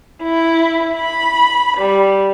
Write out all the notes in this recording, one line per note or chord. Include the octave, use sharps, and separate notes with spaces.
E4
B5
G3